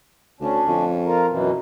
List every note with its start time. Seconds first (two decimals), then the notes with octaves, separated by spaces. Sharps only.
0.41 D2 C#4 D4
0.68 F2
1.05 F4 A#4
1.28 F#2 B2 E3